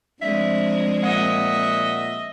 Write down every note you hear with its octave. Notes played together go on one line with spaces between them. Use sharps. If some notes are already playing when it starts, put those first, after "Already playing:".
F3 G#3 C4 D4 E5
A#2 D#5 E5 F#5